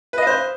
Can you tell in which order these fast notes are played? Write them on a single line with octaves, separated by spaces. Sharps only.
B4 D#5 F5 C5